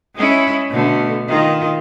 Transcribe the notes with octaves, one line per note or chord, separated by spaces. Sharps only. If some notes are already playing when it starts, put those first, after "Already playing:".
G#3 C#4 E4
B2 D3 A3
D#3 F4